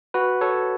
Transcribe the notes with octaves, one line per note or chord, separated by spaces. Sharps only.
F#4 B4
A4 C#5